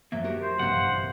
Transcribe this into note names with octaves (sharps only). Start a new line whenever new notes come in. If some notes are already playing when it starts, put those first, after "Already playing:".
F#2 F3 F#3 A#3 E5
F#4 G4 A#4
C5
A#1 G2 C3 E3 A#3 F5 F#5